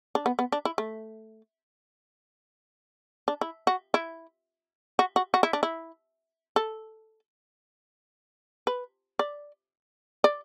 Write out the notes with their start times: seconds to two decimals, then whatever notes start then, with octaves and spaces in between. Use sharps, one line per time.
0.15 D4
0.26 B3
0.39 B3
0.52 D4
0.65 E4
0.78 A3
3.28 D4
3.41 E4
3.67 F#4
3.94 E4
4.99 F#4
5.16 F#4
5.34 F#4
5.43 E4
5.53 D4
5.63 E4
6.56 A4
8.67 B4
9.19 D5
10.24 D5